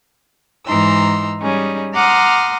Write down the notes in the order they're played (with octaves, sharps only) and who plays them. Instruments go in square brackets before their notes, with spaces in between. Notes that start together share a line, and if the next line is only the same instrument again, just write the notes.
[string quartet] G#2 E3 D#4 A#5 C6 E6
G3 C#4 D#4 G#4
F#5 A#5 C6 D6 D#6 F6